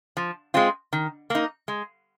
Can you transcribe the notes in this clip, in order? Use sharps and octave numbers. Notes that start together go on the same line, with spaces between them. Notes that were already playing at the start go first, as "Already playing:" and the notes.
F3
G#3 C4 F4
D#3
A#3 D#4
G#3